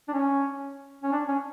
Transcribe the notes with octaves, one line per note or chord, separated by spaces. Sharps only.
D4
C#4
C#4
D4
C#4